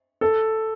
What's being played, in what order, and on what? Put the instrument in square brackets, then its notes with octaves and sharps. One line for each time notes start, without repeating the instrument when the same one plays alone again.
[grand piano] A4